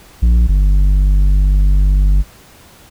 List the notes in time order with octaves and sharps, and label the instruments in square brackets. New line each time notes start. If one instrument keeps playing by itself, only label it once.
[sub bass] A#1
G1